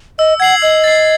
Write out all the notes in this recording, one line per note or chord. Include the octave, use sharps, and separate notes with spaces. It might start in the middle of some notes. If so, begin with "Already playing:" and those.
D#5 E6
F#5 G#6 C7 F#7
D#5 E6
A6 C7